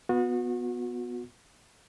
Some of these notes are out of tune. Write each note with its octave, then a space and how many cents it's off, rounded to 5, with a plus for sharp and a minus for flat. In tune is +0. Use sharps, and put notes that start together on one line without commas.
B3 +0 F#4 -35